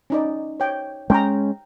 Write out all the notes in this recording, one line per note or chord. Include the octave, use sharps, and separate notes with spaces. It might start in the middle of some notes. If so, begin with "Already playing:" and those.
C#4 D#4 D5
C#5 G5
G#3 C#4 G5 A#5